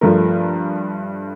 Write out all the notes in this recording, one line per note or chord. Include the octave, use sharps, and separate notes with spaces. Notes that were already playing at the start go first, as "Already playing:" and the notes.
G2 F3 A3 A#4